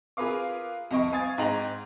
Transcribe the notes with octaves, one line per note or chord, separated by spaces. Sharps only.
F4 G#4 A#4 B4 F5 D6
C2 F2 D#5 C#6 D7
F5 G#5 C#6 D#6 G#6 A6
G#2 D#4 G5 A#5 F#7